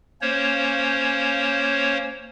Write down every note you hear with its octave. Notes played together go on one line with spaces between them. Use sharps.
A#3 C#4 C5 C#5